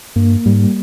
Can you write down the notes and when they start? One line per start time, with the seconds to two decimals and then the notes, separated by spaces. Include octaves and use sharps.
0.16 G2 A#3
0.46 G#2 G3